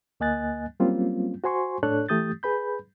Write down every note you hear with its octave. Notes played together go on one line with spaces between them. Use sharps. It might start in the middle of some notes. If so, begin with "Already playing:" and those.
D2 A#3 D#5 G#5 F#6 A6
F#3 G3 A#3 C4 C#4 F4
F#4 C5 G#5 C6 C#6
A2 D4 A4 C#5 F#6
E3 A3 G4 D#6 G6 A6
G#4 B4 B5 G6